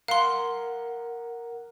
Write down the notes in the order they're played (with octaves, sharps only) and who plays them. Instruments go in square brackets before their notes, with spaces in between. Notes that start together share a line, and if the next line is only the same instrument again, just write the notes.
[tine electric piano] A#4 F#5 [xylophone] F5 C6